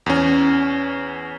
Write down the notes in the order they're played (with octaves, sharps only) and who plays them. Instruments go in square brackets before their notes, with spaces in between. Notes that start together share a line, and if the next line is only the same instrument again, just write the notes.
[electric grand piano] E2 C#4